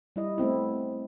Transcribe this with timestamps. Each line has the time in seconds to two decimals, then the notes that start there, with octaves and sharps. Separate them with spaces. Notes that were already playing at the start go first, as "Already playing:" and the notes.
0.16 G3 E4 D#5
0.38 A3 B3 C4 E4